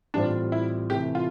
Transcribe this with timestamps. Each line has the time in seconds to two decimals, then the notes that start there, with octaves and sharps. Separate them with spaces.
0.14 A1 A2 G3 C4 D4 F4
0.52 E4
0.90 C3 E3 A3 G4
1.15 F4